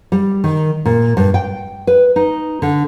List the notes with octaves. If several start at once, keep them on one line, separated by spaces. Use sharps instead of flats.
G3
D#3
A#2
G2
G5
B4
D#4
D3